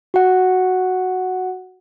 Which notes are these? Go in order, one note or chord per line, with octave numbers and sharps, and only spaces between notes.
F#4 F#5